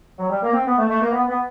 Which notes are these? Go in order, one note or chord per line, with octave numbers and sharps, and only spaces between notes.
F#3
G3
A#3
C4
B3
A3
A3
A#3
B3
B3